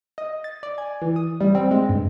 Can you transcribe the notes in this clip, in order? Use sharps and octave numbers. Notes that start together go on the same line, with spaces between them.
D#5
A6
D5
G#5
E3
D#6
G3
C4
G#3
G2